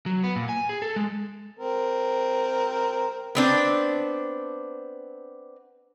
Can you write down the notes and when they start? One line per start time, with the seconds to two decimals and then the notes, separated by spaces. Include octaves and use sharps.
0.06 F#3
0.24 B3
0.36 A#2
0.49 G#5
0.69 G#4
0.82 A4
0.96 G#3
1.59 C4 A#4
3.35 B3 C4 D4